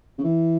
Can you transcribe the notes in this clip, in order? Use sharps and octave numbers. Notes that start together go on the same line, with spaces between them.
C#3
E3